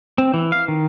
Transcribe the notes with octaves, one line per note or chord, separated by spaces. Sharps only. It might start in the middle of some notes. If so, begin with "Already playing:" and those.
C4
E3
F5
D#3